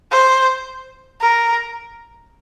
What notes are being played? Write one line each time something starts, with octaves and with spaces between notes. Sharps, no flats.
C5
A#4